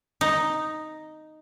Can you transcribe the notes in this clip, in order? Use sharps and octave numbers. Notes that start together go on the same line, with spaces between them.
D#4